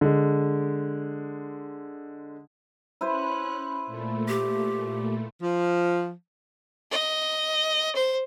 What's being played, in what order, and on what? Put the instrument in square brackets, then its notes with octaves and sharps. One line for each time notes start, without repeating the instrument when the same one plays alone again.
[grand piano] D3 G#3
[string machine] C#4 F#6 [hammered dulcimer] E4 B4 C5
[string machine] A#2 A3
[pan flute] G4
[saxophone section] F3
[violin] D#5
C5